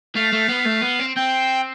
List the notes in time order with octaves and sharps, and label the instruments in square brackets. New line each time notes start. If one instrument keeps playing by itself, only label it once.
[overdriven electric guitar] A3 [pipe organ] F5
[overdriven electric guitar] A3
B3
A3
B3
C4
[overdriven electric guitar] C4 [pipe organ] G5